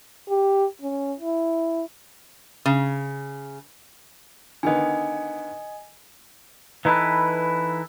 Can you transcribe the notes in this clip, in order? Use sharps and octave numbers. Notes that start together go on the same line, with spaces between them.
G4
C#4
E4
C#3
D3 D#3 B3 D#5 G#5
E3 D#4 E4 A4 B4